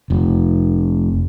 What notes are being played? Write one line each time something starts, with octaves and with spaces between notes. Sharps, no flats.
F1